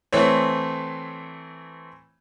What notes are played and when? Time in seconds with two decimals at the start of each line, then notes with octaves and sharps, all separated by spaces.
0.13 E3 A3 C4 C#5